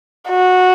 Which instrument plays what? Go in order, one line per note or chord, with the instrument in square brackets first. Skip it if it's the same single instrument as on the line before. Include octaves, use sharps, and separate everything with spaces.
[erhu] F#4